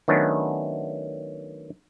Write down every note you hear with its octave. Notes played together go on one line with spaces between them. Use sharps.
D#3 F#3 A3 B3 C#4 D4